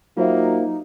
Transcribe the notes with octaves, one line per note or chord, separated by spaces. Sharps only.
F#3 A#3 D#4 F4 C5 E5